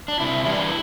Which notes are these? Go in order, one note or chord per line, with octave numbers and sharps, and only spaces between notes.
D4
C3 E4
E3 G3 D4 E4